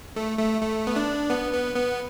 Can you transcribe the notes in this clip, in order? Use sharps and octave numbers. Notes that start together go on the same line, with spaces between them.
A3
A3
A3
B3
D4
B3
B3
B3